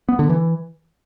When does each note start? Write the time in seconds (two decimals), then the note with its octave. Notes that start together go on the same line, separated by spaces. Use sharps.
0.09 B3
0.19 D3
0.29 E3